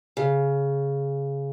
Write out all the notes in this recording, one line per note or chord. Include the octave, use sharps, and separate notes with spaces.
C#3